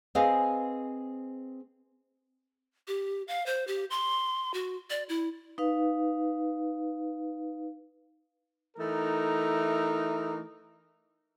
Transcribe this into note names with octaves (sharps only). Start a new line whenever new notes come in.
C4 G#4 B4 D#5 F5 G#5
G4
F5
C5
G4
C6
F#4
D5
E4
D#4 B4 F5
E3 A3 D#4 A#4